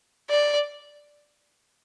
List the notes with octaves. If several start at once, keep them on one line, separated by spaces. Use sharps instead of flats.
D5